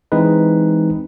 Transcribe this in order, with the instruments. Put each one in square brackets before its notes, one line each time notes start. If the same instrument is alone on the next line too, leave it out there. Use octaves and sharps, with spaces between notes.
[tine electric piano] E3 G#3 C4 D#4 B4